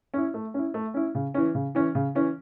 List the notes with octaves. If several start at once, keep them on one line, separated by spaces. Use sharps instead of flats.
C#4 E4
A3
C#4 E4
A3
C#4 E4
C#3
E3 C#4
C#3
E3 C#4
C#3
E3 C#4